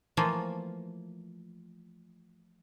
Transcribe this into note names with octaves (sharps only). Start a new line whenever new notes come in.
E3 F3 A3 A#3 F4